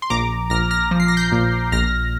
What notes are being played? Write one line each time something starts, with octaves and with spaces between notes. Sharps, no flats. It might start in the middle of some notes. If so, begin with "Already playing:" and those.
C6
A#1 A#5 D6
A#1 F6 A#6
F6 A#6
F3
C7
A#6
G6 C7
A#2
A#1 F6 A#6